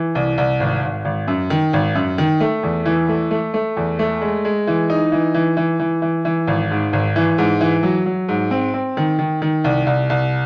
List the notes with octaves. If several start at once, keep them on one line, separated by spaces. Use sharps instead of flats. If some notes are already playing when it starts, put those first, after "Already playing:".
Already playing: E3
C2
C2
G#1
G#1
G#1
F#2
D#3
G#1
F#2
D#3
A3
E2
E3
A3
A3
A3
E2
A3
G#3
G#3
E3
D#4
E3
E3
E3
E3
E3
E3
G#1
G#2
G#1
E3
G#2
E3
F#3
F#3
G#2
C4
C4
D#3
D#3
D#3
C2
C2
C2